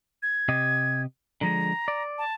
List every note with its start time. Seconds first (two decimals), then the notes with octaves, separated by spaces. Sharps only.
0.23 G#6
0.49 C3 G4 D#5
1.41 D3 F3 G#3 A#5
1.88 D5
2.18 A5